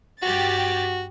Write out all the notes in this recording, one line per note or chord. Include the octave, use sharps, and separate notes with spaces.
G2 F#4 G4 A6